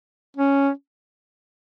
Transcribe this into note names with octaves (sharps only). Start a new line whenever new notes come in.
C#4